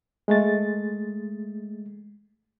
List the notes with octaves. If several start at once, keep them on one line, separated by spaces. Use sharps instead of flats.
G#3 A3 A6